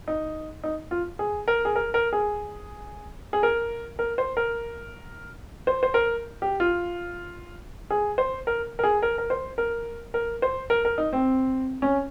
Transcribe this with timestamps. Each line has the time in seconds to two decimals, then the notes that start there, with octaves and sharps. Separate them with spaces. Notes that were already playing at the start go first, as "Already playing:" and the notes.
0.08 D#4
0.63 D#4
0.91 F4
1.19 G#4
1.48 A#4
1.65 G#4
1.76 A#4
1.94 A#4
2.13 G#4
3.33 G#4
3.43 A#4
3.99 A#4
4.18 C5
4.37 A#4
5.67 C5
5.83 C5
5.94 A#4
6.42 G4
6.60 F4
7.90 G#4
8.18 C5
8.47 A#4
8.79 A#4
8.83 G#4
9.02 A#4
9.18 A#4
9.30 C5
9.58 A#4
10.14 A#4
10.42 C5
10.70 A#4
10.85 A#4
10.98 D#4
11.13 C4
11.82 C#4